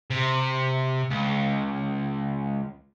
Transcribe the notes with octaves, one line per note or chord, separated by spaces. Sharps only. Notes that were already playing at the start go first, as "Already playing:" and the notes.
C3
C#2